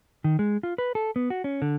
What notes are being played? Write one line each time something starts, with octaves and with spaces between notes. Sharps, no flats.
D#3
G#3
F4
B4
A4
B3
F#4
C#4
D3